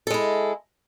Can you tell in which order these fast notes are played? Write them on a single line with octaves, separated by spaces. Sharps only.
A4 G#3 E4